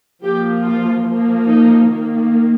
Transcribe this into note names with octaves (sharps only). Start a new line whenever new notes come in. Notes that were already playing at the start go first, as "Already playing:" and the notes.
F3 A#3 G4
F4
F3 A#3
D#4
D#3 A#3